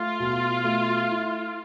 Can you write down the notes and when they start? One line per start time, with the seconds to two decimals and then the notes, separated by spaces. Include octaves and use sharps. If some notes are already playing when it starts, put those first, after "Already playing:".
Already playing: A3 F4
0.20 B2
0.64 A3
1.09 E4